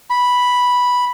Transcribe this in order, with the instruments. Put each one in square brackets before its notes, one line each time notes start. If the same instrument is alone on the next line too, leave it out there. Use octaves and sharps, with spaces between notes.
[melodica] B5